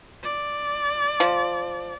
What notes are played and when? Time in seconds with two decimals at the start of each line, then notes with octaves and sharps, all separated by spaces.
0.23 D5
1.20 F3